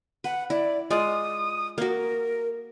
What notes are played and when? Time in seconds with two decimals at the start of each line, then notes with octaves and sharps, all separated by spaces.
0.24 B4 F#5
0.50 E4 D5
0.90 G#3 F4 D5 D#6
1.78 A#3 F#4 A#4